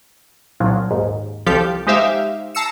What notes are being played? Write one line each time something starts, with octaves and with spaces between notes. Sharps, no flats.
C2 A#2 F3 F#3
D#2 G#2
C2 F3 G4 A4 F5 G6
G#3 D#4 G4 C5 E5 F5
A5 A#5 E6 C7 C#7 E7